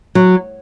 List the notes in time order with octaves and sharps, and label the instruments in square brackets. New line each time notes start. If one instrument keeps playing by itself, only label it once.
[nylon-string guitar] F#3